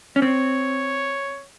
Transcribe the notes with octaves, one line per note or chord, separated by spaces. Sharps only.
C#4
C4 C#5